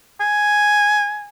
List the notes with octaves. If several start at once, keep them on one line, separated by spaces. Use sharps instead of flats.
G#5